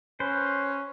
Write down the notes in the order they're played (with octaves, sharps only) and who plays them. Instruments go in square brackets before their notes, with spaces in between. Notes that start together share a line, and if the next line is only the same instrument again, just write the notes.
[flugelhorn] C#4 [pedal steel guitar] B4 C5